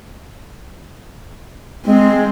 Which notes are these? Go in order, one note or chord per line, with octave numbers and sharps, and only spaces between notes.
G#3 C4